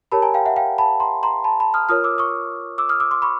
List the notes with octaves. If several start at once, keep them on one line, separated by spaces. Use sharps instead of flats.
G4 A#4 C#5 A5 B5
G#5 A#5
F5 G5
E5 F#5
F5 G5
A5 B5
A#5 C6
A#5 C6
A5 B5
A5 B5
D#6 F6
F4 A#4 C#5 D#6 F6
D6 E6
C#6 D#6
D6 E6
D#6 F6
D6 E6
C6 D6
B5 C#6